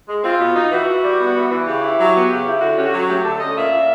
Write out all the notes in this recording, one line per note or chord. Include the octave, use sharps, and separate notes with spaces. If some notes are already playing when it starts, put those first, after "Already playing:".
G#3
C4 F4
B2
D#4
E3 F#4
E3
G3
B3
E3
E3
C#3 G4
E4
F#3
B3
C#3
E4
D3 F#4
C#4 G4
F#4
F#3
A3 G4
D3 A4
C#4 D#5
A#2 E5
A#2